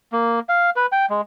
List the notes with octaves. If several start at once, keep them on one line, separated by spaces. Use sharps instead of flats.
A#3
F5
B4
G5
G#3